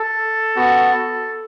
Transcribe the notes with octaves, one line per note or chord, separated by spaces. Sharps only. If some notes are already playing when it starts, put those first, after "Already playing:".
Already playing: A4
B3 F#4